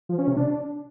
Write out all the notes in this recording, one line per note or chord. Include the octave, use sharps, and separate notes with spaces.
F3
C#4
C3
D4